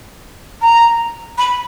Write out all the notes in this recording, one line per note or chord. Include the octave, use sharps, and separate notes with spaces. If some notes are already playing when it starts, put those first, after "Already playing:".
A#5
B5